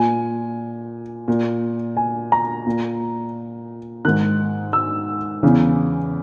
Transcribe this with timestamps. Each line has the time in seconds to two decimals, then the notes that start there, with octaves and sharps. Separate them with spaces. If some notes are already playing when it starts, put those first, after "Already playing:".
Already playing: A#2 G#5
1.28 A#2
1.97 G#5
2.32 A#5
2.67 A#2
4.05 G#2 D#3 F#6
4.73 E6
5.43 E2 C#3 E3